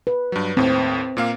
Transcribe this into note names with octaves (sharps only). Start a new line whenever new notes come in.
B4
G2 F#3
D#2 A2 C4
A#2 A#3 F5